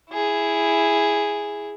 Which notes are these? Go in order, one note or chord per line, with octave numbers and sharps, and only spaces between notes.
E4 G#4